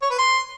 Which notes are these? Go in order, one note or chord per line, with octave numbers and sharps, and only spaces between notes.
C#5
B4
C6